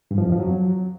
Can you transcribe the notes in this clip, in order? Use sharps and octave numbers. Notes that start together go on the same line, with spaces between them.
G2
F3
F2
F3
F#3